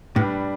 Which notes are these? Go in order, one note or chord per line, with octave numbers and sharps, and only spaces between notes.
A2 G3 D4 G4 B4